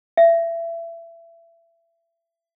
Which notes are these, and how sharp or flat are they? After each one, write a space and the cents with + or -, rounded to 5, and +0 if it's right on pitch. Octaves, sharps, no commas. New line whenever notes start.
E5 +25